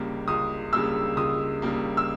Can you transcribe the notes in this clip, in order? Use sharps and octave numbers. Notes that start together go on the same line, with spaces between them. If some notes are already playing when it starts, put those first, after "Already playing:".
Already playing: C#2 C#3 G3 A#3
C#2 D#6
C#3 G3 A#3 E6
C#2 D#6
C#3 G3 A#3
E6